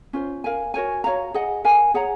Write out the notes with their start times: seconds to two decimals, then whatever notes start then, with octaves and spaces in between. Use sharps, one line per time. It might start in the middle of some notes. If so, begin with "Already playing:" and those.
0.13 C#4 F4 C5
0.44 A#4 F5 G#5
0.74 F#4 A#4 C#5 G#5
1.04 F#4 C#5 F5 A#5
1.34 G#4 D#5 F#5
1.64 A#4 F5 G#5
1.94 G#4 C#5 F#5 A#5